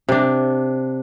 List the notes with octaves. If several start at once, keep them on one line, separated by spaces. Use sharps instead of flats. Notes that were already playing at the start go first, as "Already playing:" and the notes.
C3 D4